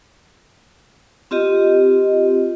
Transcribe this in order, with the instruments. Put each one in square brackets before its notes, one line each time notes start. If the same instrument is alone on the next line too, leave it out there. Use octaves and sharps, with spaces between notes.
[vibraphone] C4 F4 G4 D#5